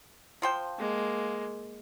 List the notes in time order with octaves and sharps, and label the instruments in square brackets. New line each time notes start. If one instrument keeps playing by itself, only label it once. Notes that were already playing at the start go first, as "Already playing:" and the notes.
[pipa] F3 C5 G5
[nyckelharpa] G#3 A#3